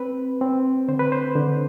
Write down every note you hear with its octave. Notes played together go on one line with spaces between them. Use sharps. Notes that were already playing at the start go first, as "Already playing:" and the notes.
Already playing: C4 B4
C4
D3 C5
B4
C5
D3